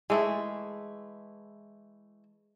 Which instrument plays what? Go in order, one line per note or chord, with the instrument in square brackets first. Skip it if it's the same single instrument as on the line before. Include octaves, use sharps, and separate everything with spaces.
[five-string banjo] E3 A3 E4 [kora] G#3